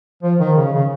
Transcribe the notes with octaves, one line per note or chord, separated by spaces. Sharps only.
F3
D#3
C#3
C#3